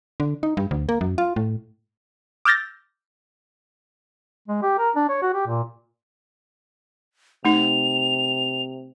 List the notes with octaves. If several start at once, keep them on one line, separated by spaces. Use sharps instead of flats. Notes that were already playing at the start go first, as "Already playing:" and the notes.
D3
D#4
G2
D2
A#3
F#2
F4
A2
D6 E6 F6 G6 A6 A#6
G#3
G4
A#4
D4
C#5
F#4
G4
A#2
C3 A3 D#4 F7